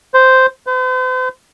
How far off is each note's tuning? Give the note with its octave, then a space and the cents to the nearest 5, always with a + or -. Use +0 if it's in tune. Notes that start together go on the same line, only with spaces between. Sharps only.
C5 -5
C5 -45